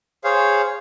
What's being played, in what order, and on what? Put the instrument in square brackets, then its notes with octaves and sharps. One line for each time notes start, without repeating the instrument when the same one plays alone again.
[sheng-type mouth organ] G#4 C5 C#5 F5